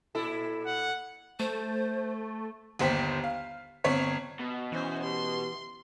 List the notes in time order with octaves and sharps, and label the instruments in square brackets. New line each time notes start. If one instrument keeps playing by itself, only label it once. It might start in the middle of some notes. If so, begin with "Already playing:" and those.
[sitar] A#2 E4 A4
[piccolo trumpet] F#5
[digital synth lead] A3 [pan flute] C5
[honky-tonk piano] G1 D#2 C5 G5 B6
F5
G1 C4 C#5 B6
[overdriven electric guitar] B2
[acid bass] E3 [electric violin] C#4 C5
[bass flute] G4 [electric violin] C6